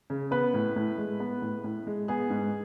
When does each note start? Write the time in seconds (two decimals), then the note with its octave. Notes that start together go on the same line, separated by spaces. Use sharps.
0.10 C#3
0.31 B3 B4
0.54 A2
0.76 A2
0.98 G#3
1.20 B3
1.42 A2
1.64 A2
1.87 G#3
2.08 B3 G#4
2.30 G#2